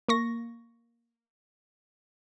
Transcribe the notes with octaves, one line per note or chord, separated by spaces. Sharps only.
A#3 C#6 A#6